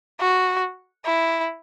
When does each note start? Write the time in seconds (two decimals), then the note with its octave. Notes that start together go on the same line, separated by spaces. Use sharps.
0.20 F#4
1.05 E4